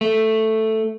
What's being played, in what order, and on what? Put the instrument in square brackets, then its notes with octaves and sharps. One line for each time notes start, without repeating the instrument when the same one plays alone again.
[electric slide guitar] A3